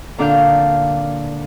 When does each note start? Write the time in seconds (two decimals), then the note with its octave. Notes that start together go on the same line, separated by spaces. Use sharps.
0.18 A#2 D3 D4 D5 F5 G6